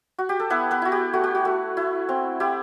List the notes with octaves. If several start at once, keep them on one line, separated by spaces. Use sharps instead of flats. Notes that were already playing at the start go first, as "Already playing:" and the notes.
F#4
G4
A4
B3 E4 B4
B3 B4
E4 F#4
G4
A3 F#4
G4
F#4
A3
E4
C4
E4 G4